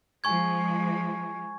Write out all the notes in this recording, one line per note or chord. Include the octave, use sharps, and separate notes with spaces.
F3 G#3 G#5 C#6 G#6